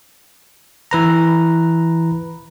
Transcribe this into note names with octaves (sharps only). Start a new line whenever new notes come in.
E3 B4 A#5